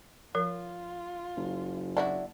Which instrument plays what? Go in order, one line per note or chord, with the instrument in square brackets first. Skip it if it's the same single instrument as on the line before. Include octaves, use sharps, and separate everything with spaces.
[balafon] F3 A#4 [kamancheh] F4
[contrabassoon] F#1
[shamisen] D4 E4 F#4